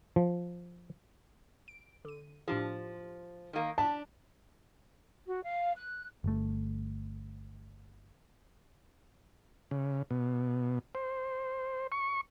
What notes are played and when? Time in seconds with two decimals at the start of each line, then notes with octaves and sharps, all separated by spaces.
0.16 F3
1.68 D7
2.05 D3 D#7
2.48 A2 F3 D4 G4
3.53 D#3 A#3
3.78 D4 A5 B6
5.27 F#4
5.43 F5
5.76 F#6
6.24 G1 A3
9.71 C#3
10.11 B2
10.95 C5
11.92 C#6